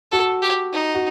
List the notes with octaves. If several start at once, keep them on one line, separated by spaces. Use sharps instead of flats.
F#4 A4
G4
D#4
F#4